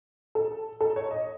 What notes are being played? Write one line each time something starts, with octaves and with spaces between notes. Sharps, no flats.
A4
A4
C#5
D#5